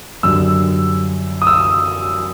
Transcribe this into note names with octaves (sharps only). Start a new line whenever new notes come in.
F#2 D3 G3 E6
D#6
E6